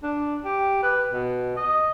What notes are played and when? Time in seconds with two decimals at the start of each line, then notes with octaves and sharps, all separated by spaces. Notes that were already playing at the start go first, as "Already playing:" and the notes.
0.03 D4
0.45 G4
0.83 B4
1.12 B2
1.57 D#5